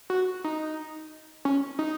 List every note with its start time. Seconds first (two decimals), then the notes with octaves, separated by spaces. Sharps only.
0.10 F#4
0.44 D#4
1.45 C#4
1.79 D#4